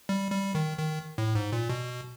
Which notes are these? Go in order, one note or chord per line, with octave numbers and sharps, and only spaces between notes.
G3
G3
D#3
D#3
A2
G#2
A#2
B2